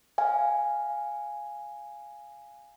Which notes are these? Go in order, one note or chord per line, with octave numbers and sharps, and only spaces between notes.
F5 G#5